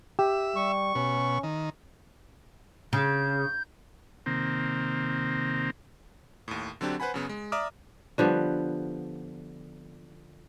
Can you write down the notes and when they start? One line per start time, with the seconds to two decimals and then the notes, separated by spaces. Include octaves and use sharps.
0.19 G4 E5
0.56 G3 C#6
0.95 B2 C#4
1.43 D#3
2.93 C#3 G6
4.26 C3 D#3 A#3 C4
6.48 D#2 A2
6.81 D3 F#3 C4 D4 G4
7.00 B4 C5 F#5 G#5 B5
7.14 F#2 C#3 B3
7.29 G#3
7.52 D5 E5 A#5 D6 D#6 F6
8.18 D3 F3 G3 B3